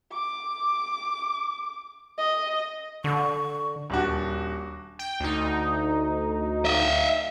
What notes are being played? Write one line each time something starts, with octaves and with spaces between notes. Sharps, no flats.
D6
D#5
D3 C#6
D#1 D4 F#4
G5
D2 D#4
D#5 E5